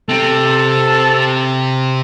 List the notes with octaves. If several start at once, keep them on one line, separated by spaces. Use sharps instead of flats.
C3 C4 A4